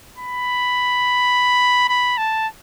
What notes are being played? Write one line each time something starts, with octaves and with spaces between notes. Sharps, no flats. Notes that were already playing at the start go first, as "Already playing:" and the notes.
B5
B5
A5